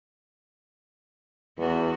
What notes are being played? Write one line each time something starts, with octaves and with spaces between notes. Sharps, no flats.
E2 B3 F#4